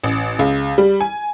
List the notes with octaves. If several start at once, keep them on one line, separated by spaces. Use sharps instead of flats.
A1
C#2
G3
G#5